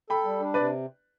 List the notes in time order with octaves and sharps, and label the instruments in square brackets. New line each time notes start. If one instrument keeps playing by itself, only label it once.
[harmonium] A4 [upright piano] G5 B5
[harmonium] G3
D4
[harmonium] C3 [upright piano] B4 D5